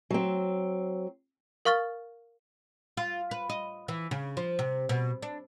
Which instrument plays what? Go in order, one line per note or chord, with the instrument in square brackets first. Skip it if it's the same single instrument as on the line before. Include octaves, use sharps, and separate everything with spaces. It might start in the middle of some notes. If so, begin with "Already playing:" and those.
[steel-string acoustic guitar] F#3 C4
[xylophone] A#4 F5 C#6 F6 A6 G7
[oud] F4
B4
D#5
E3
C#3
F3
C3
B2
D4